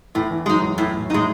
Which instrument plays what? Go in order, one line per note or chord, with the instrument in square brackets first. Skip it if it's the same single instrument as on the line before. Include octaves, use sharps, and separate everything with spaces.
[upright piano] E2 E3 [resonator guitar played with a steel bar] A2
[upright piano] E2 E3
[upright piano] F#2 F#3 [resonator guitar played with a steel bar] G#3
[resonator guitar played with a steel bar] D#4
[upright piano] E2 E3
[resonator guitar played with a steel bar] A2
[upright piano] A2
[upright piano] A2 [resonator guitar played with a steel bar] D#4
[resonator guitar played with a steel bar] G#3